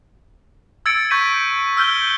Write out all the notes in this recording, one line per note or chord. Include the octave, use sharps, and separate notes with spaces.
E6 G#6 A6 C#7 D7
C#6 G6 G#6 B6 D#7
E6 F6 G6 G7